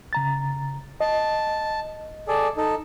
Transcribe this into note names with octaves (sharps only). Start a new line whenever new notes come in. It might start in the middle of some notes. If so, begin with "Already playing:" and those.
C#3 A#5 A6
D#5 A5
G#4 A4 D5
D#4 A4